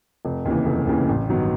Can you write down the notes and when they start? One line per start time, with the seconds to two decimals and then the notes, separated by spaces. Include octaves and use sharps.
0.25 F1
0.45 D#2 C#3 E3
0.66 F1
0.87 D#2 C#3 E3
1.08 A1
1.28 G2 D#3 F#3 B3